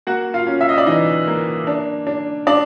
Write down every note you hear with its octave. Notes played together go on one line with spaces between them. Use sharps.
A#3 F#4 F#5
F4 F5
C#4
E5
D#5
D5
E3 D#4 D#5
A#3
D4
D4
D4 D5